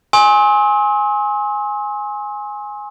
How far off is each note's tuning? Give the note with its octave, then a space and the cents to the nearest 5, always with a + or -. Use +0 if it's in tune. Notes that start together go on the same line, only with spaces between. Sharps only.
G#5 +0 C6 +35 E6 -45